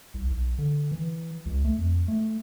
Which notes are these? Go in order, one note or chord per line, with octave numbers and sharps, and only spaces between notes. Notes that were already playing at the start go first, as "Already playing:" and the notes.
C2
B1
D3
E3
C#2
A3
F2
A3